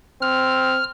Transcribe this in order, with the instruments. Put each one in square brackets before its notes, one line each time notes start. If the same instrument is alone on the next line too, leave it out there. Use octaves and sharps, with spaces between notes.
[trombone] C4 [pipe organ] F6